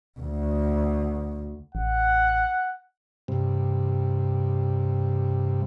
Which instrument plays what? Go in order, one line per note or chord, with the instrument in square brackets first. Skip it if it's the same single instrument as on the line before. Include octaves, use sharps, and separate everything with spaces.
[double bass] D2
[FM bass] A1 [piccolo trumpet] F#5
[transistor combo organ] G2 C3